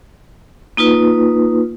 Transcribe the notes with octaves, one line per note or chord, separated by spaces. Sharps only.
A#3 D#4 F4 B4